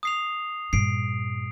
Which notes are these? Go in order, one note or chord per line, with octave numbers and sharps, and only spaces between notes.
D#6 C7 F7
G2 A#2 C7 D7